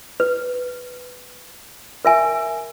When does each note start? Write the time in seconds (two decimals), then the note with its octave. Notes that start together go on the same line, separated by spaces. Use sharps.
0.20 B4
2.05 A#4 E5 G#5